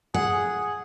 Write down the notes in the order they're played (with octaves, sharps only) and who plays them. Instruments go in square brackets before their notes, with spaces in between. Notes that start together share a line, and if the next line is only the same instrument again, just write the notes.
[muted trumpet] G#4 [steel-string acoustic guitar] F#5